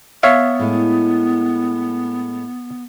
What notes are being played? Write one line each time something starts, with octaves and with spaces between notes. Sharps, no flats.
B3 C#5 E5 F5
A2 G#3